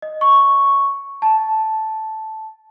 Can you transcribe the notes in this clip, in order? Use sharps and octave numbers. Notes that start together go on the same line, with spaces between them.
D#5
C#6
A5